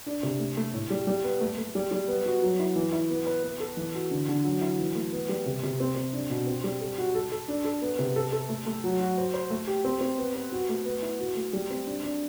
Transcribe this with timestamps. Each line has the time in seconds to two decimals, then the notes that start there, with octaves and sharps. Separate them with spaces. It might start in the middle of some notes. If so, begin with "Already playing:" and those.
0.06 D4
0.23 C3
0.39 A3
0.57 A3
0.74 A2
0.90 G3
1.07 G3
1.24 B3
1.41 A3
1.58 A3
1.75 G3
1.91 G3
2.08 B3
2.26 F#4
2.42 F#3
2.60 E4
2.76 E3
2.92 E4
3.10 B3
3.26 B4
3.43 B3
3.60 A4
3.77 E3
3.95 F#4
4.11 D3
4.28 D3
4.44 F#3
4.61 E4
4.79 E3
4.95 A3
5.12 B3
5.29 G3
5.46 C3
5.63 C3
5.80 C4
5.96 C4
6.13 D4
6.30 B2
6.47 C4
6.64 G3
6.80 A4
6.98 F#4
7.15 A4
7.31 A4
7.48 D4
7.64 A4
7.82 B3
7.99 C3
8.16 A4
8.32 A4
8.49 A3
8.66 A3
8.84 F#3
9.00 F#4
9.17 C5
9.34 C5
9.50 A3
9.67 G4
9.84 C4
10.01 C4
10.18 B3
10.35 B4
10.52 F#4
10.69 A3
10.85 B3
11.02 E4
11.20 F#4
11.36 A3
11.53 G3
11.70 C4
11.87 D4
12.03 D4